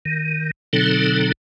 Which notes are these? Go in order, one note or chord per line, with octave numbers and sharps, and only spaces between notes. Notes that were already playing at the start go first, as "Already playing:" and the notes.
D#3
B2 D3 F#3 C4 D#4 A4